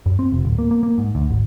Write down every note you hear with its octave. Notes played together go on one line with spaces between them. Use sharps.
F#2
C4
F1
D1
A#3
A#3
A#3
G#2
D2
G#1